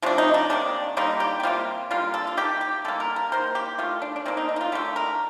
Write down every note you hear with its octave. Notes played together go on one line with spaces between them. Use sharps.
C3 F3 A3 D4
D#4
D4
C3 D#3 A#3 D4
D3 G3 A#3 D#4
G4
G4
C3 G3 A#3 F4
D3 G3 A#3 F4
A4
F4
D#3 A#3 G4
G4
D3 G3 A#3 A4
A#4
A#4
D#3 A#3 C5
G4
D#3 A3 F4
D4
D4
D#3 A#3 C4
D#4
D4
D#4
F4
D3 A3 G4
A#4